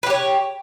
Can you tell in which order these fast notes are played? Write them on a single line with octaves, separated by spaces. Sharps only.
B4 G4 C#5